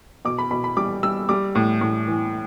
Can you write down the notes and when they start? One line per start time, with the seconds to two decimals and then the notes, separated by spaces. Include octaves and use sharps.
0.25 B2 D6
0.38 B5
0.51 B2 B5
0.64 B5
0.77 G3 D6
1.03 G3 E6
1.29 G3 D6
1.55 A2
1.81 A2
2.07 E3